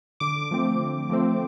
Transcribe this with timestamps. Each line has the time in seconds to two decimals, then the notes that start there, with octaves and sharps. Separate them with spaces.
0.20 D3 D6
0.51 F3 A3 C4
0.80 D3
1.09 F3 A3 C4